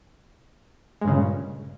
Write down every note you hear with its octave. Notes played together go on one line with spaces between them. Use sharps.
G2 A#2 C#3 G#3